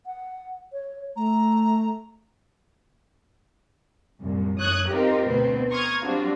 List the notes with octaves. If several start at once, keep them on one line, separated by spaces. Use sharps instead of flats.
F#5
C#5
A3 A#5
C2 F#2 A#2
F#2 C#5 D#6 F#6 G#6
C4 D#4 F4 G4 A#4
D2 B2 B3 C4
A#5 C6 C#6 D#6 F6 G#6
F#3 G3 C4 D4 F4 F#4